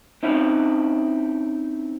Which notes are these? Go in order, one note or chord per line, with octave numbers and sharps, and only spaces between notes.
C4 C#4 D#4 E4